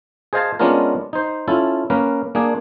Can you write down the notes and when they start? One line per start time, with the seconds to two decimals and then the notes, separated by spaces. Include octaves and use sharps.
0.33 G#4 C5 D#5 F5 G#5 A5
0.59 G#3 B3 C#4 D4 F4 A#4
1.13 D#4 C5
1.48 C#4 E4 F4 A4
1.90 A#3 C#4 A#4 B4
2.35 A#3 D4 G#4